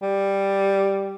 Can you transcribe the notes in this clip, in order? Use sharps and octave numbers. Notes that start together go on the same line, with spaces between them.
G3